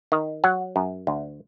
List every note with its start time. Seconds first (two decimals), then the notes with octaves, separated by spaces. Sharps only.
0.12 D#3
0.44 F#3 F#5
0.76 F#2
1.07 D2